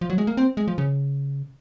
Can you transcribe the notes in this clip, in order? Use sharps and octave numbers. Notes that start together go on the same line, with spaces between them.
F3
F#3
G#3
A#3
C4
G#3
F3
C#3